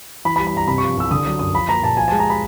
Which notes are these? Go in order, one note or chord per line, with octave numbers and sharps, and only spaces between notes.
E3 B5
B5
G3
B5
G2 A#5
C3 B5
F3 C#6
C2 E6
D3 D#6
F#3
F#2 D#6
F3 B5
A#3 A#5
A#2 A5
F3 G#5
G#3 A5
A#5
B5